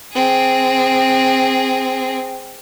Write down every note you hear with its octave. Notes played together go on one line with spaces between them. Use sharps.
C4 G#4